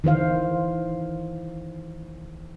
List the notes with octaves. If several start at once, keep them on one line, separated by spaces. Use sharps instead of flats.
D#3 E3 C5 F5